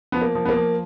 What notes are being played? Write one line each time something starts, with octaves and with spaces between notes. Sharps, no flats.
F3 B3
A#3
F3
B3
A#3
F3